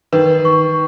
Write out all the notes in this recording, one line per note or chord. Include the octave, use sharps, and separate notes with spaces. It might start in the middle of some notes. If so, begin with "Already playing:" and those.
D#3 B4
C#6